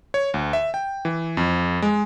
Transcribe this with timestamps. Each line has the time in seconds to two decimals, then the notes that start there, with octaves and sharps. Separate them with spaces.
0.14 C#5
0.34 D2
0.53 E5
0.74 G5
1.05 E3
1.37 F2
1.82 G#3